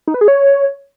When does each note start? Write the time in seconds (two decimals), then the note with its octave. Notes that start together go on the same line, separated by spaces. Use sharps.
0.07 D#4
0.14 B4
0.21 G#4
0.28 C#5